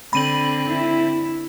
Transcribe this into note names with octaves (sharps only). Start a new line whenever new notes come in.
D3 C4 B5 D#7 F#7
E4